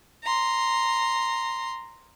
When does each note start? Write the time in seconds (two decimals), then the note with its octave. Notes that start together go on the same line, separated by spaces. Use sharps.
0.24 A#5 C6